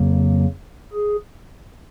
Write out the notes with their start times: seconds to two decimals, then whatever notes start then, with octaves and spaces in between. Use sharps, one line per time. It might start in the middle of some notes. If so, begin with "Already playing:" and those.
Already playing: F2 C#3 F#3 A#3
0.93 G#4